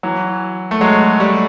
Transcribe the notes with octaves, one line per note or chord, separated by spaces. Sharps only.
E3 F#3
A3
F#3 G#3
G3 A3